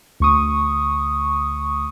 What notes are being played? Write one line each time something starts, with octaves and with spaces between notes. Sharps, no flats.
D2 C#6 D#6